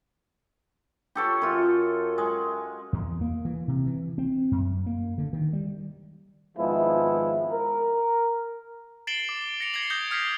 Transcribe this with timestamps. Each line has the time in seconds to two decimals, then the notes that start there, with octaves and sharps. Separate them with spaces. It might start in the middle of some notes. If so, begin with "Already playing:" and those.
1.15 G4 A4 C#5
1.42 F#2 F4
2.18 G#3
2.93 E2
3.21 A#3
3.45 E3
3.68 C3
3.86 E3
4.18 C4
4.51 F#2
4.86 A#3
5.18 D3
5.33 D#3
5.53 G3
6.58 G#1 F3 G#3 B3 E4
7.51 A#4
9.07 A6 C7 D7 E7 F#7 G7
9.29 D6
9.60 A#6 C#7 F7
9.74 G#6 A#6 C7 F#7
9.90 D#6 G6 A#6 C#7 G7
10.11 D#6 F6 G#6 B6 C7